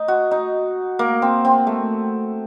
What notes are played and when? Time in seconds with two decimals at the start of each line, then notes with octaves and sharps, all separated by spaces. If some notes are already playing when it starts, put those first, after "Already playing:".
Already playing: D#4
0.08 F#4
0.31 D#4
0.99 A#3
1.22 C4
1.45 C4
1.67 A3